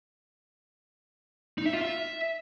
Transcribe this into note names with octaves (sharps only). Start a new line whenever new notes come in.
D#4
E5
F4
E5